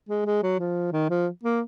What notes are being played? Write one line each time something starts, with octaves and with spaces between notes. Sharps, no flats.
G#3
G#3
F#3
F3
D#3
F3
A#3